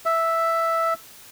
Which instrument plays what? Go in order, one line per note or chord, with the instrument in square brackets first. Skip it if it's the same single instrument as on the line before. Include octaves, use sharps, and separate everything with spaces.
[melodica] E5